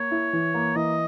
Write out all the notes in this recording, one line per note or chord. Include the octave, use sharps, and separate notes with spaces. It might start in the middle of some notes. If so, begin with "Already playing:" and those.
Already playing: A#3 C#5
E4
E3
A#3
E3 D#5